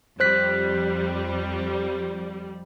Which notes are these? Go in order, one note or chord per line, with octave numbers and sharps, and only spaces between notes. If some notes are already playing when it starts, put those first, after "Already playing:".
F2 G3 C5 F#6 B6